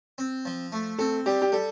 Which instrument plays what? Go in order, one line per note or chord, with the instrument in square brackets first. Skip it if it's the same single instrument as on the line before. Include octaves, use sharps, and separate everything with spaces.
[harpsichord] C4
F3
A3
[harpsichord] C4 [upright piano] A4
[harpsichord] G3 [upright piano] G4
[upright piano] G4
[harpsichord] G3 [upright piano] A4